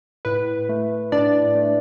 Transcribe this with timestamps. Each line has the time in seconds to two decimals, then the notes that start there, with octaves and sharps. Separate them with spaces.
0.25 A2 B4
0.69 A3
1.12 A2 D4 D5
1.55 A3